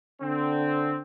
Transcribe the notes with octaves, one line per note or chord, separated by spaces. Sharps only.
D3 C4